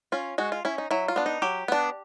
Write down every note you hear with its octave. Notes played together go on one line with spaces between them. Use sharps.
C#4 F4
G#3 F#4
F4
C#4 E4
D#4
F#3 E4
F4
B3 D4
D#4
F#3 G4
B3 D4